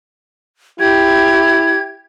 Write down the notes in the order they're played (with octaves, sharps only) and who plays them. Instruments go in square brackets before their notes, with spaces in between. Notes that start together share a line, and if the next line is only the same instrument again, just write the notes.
[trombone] E4 [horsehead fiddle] G4 [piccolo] G#6